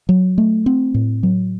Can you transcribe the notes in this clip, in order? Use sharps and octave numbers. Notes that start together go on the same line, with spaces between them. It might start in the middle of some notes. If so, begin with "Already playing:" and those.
F#3
A3
C4
A2
F#3